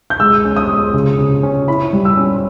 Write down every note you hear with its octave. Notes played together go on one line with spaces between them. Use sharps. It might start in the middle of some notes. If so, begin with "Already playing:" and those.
G6
G#3 E6
C#4
D#6
G#3
C#3
C#3
C#4
E4 B5
G3
E6
C#4